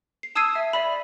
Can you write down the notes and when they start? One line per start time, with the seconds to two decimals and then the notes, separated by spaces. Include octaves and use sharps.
0.23 C7
0.35 A5 D#6 E6 G#6 C7 D#7
0.55 E5
0.73 D5 E5 B5